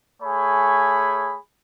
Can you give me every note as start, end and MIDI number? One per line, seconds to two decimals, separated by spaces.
0.22 1.36 57
0.22 1.36 68
0.22 1.36 73
0.22 1.36 80
0.22 1.36 83